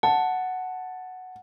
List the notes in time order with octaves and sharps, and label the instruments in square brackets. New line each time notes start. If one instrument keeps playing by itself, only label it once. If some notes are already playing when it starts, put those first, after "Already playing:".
[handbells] F#5 [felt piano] A5